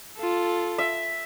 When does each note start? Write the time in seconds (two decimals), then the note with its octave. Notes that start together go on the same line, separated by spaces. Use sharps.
0.17 F4 A4
0.78 E5